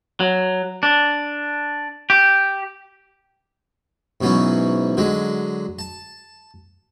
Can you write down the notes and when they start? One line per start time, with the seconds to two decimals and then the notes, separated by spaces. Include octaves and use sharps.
0.20 F#3
0.83 D4
2.10 G4
4.21 G#2 B2 E3 F#3 C#4
4.97 D3 F#3 G#3
5.79 A5